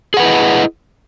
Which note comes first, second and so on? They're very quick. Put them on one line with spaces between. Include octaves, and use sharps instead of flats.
G#4 F#5 B4 E4 D#5